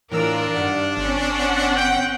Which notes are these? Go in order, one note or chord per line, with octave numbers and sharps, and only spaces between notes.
A2 E3 D4 F4 A#4 E6
G2 D#3 D5 F#5 F6
G1 C4 C#4
F#5
G5